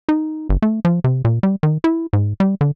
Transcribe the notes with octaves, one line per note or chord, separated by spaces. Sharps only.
D#4
G1
A3
F3
C3
A#2
G3
D#3
E4
G#2
G3
D3